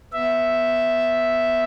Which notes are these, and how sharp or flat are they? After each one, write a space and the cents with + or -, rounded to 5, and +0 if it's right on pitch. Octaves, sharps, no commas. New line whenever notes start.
B3 +0 E5 +0